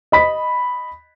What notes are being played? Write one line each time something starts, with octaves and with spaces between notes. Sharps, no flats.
D#5 B5 B6